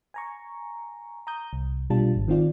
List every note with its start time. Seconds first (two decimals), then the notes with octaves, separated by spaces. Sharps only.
0.14 G#5 A#5 C#6
1.27 A#5 D#6 G6
1.53 C2
1.90 B1 B2 G3 D4 F4 A5
2.16 G#1
2.28 D#3 C4 F4 D5